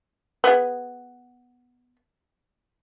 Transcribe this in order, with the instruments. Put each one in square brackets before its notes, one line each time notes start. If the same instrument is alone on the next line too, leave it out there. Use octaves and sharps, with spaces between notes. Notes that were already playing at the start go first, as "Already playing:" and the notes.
[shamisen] B3 G#4